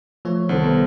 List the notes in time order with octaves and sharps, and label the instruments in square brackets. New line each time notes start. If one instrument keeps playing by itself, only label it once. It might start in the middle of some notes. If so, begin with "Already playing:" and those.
[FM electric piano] F3 C#5 [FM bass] A3
[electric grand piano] C2 [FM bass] D#3 [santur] A4 C5 D5
[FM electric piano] B3